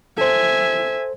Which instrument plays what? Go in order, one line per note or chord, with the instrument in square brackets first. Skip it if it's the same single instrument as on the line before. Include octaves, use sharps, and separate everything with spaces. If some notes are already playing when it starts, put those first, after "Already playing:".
[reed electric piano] A4 C5 [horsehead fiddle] E5 G#5